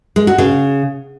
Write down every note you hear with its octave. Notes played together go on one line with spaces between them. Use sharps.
G#3
F#4
C#3